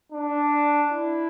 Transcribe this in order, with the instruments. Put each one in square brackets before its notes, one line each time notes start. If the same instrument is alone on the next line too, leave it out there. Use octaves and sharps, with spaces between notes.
[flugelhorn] D4
E4